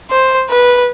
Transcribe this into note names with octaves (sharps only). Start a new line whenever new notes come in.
C5
B4